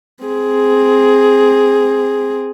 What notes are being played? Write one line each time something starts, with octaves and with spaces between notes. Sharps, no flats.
C4 G#4